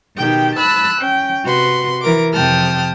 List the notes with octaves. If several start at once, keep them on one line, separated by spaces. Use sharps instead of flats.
B2 D#3 G4 G5
A5 B5 E6 F#6
C#4 G5
C3 F#4 B4 C6
E3 A#4 D6
F2 C3 G5 A5 D#6 F6